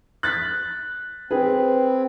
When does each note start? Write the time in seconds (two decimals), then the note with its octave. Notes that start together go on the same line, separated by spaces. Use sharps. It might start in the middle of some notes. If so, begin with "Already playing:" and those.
0.23 F#6 A6 B6
1.31 C4 G#4 B4